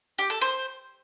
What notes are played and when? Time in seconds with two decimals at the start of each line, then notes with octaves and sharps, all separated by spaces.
0.18 G4
0.30 A4
0.41 C5